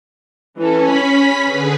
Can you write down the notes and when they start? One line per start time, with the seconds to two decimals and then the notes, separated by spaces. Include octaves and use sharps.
0.58 E3 C#4 A4
0.89 B5 B6
1.43 D3 G#4 B4